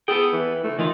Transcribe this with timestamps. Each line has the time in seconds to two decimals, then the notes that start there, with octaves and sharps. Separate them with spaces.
0.08 B3 G#4 A4 G5
0.33 E3
0.64 A3
0.79 D#3 E3 F4